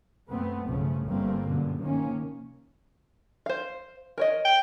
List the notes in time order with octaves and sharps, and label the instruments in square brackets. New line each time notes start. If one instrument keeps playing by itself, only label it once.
[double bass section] F#2 C3 A3 B3 C4
B1 G2 C#3 F3 A3 C#4
G1 G3 A3 A#3 C4
F#2 B2 D3
C3 D#3 F3 A#3 C#4
[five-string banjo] C5 F5
A#4 C#5 D#5
[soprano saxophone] G5